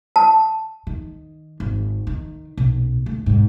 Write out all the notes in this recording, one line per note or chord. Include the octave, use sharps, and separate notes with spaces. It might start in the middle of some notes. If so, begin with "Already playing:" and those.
A5
D#3
G#1
D#3
B1 A#2
D2
G#2 B2